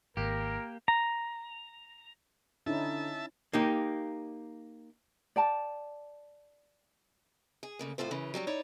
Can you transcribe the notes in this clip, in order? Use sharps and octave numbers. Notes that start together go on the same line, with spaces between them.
G#1 A#3 G4 A#4
A#5
D3 C#4 D#4 E4 E5 A5
A#3 D#4 G4
D5 G5 A5
G#4
D2 C#3 A#3
F2 A2 F4 A4 C5
F#2 C#3 E3 C#4
F#3 G3 C#4 D4
D#4 E4 C#5 D5